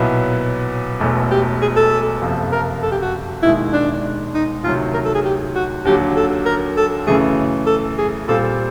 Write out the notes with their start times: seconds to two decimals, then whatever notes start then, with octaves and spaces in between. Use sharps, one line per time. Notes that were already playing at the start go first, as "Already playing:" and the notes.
Already playing: B1 A#2 F#3 B3 E4
1.00 E1 E2 B2 F#3 A3
1.31 G4
1.62 G#4
1.76 A4
2.22 F#1 F2 C3 F3
2.52 A#4
2.83 A4
2.92 G4
3.02 F#4
3.43 E1 D#2 D#3 G#3 E4
3.73 D4
4.34 D#4
4.64 D2 C3 D#3 F#3 F4
4.94 A#4
5.05 A4
5.15 G#4
5.25 G4
5.55 F#4
5.85 D#2 D3 F#3 G4
6.16 A4
6.46 A#4
6.77 A4
7.07 F#2 C#3 E3 A3 G#4
7.67 A4
7.98 G#4
8.28 A#2 G3 C4 F4 A4